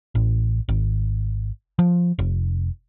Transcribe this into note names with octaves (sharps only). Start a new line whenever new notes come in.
A1
G#1
F3
F1